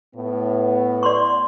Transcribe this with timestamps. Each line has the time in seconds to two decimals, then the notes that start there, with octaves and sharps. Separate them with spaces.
0.16 A2 B3
1.03 D5 C6 C#6